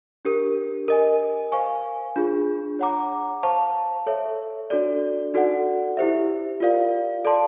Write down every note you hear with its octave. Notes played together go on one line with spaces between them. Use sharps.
D4 G4 A#4
A#4 D#5 G#5
C5 F5 G#5 C#6
D4 F4 G#4
C#5 F#5 A#5 D6
C5 F5 A5 C#6
A4 C#5 E5
D4 F#4 A4 D5
D#4 F#4 A4 D5 F#5
E4 G4 C5 E5
F4 A#4 D5 F5
A4 D5 F5 A5 C6